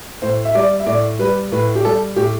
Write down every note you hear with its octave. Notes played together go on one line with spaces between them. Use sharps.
A2 C5
E5
G3 D5
E5
A2 D5
G3 B4
A2 B4
G4
G3 A4
A2 G4